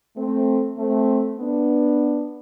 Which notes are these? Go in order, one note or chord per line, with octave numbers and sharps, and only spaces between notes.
A3 C4
A3 C4
B3 D4